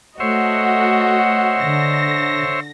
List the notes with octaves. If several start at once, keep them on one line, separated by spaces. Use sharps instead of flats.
A3 F#4 C5 C#5 D#5 E5 F#5
D3 A#6